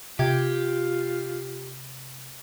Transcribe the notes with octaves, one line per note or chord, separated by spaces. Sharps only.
C3 F4 G4 G5 G#6